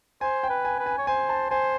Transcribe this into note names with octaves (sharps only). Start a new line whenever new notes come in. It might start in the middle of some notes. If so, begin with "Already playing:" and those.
C5 G#5
G5
B4
G#5
B4
G#5
C#5
C5 G#5
A5
C5 G#5